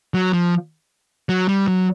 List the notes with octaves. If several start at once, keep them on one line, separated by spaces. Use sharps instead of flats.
F#3
F3
F#3
G3
F#3